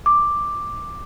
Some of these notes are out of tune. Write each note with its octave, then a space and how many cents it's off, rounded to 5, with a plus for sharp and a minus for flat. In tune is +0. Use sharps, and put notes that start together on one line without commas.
D6 +5